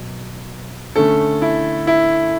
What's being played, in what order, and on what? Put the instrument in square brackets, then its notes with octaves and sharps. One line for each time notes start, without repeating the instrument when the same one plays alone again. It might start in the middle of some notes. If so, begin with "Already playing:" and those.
Already playing: [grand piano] B2 F#3
D3 A3 C#4 A4
E4
E4